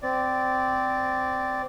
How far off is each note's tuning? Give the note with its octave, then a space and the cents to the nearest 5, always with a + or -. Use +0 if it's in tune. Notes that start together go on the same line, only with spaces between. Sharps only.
C4 -15 D5 -5